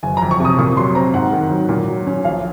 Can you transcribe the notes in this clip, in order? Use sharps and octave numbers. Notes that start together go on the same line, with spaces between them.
F#1 G#5
A#5
F2
C#6
C3
D#6
A#2 C#6
F#3 C6
C4 A#5
G#2 F#5
D#3
F#3
A#2
F#3
C#4
A#1 F5